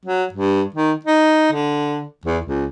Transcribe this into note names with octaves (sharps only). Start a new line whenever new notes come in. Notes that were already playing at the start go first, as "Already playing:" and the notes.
F#3
G2
D#3
D#4
D3
E2
C#2